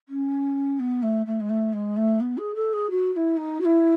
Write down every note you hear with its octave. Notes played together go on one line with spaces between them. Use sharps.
C#4
B3
A3
A3
G#3
A3
G#3
A3
B3
G#4
A4
G#4
F#4
F#4
E4
D#4
F#4
E4